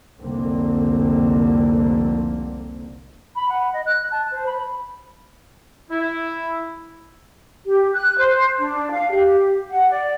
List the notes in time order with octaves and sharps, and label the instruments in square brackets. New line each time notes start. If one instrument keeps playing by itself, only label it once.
[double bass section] F1 C2 D3 A#3 C4
[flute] B5
F#5
D#5
F#6
A5
C5
B5
[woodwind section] E4
[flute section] G4
F#6
C5
D4
F5
G4
F#5
D5